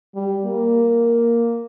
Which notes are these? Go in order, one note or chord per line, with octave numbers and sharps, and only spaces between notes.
G3
A#3